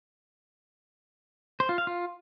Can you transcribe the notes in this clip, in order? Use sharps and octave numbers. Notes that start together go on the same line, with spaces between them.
C5
F4
F5
F4